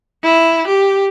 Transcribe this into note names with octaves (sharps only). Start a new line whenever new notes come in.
E4
G4